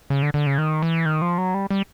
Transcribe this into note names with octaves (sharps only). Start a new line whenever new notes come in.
C#3
D3
D3
C#3
D#3
E3
D#3
F3
F#3
G3
G3